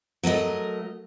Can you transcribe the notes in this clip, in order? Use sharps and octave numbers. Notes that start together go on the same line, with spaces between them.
F#3 A3 A#4 D#5